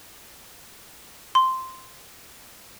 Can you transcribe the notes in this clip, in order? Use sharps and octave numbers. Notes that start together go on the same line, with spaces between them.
C6